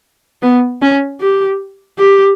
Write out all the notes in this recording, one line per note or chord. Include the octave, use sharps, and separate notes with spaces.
B3
C#4
G4
G4